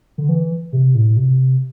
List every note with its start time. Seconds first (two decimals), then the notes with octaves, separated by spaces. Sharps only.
0.18 D3
0.29 E3
0.73 C3
0.95 A2
1.17 C3